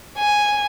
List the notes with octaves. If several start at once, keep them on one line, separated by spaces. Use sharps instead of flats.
G#5